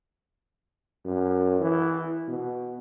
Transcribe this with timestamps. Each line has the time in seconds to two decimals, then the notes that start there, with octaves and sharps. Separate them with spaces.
1.05 F#2
1.60 E3
2.28 B2